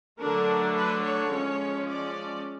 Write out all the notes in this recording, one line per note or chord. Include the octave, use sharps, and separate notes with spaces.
D3 F#3 A3 D4 A#4
B4
C#5
F3 G#3 C#4
D5